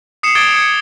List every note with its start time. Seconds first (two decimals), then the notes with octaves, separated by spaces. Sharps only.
0.23 D#6 C7 C#7 E7
0.35 D6 D#6 G#6 A6 D7 G7
0.54 D#6 G#6 C#7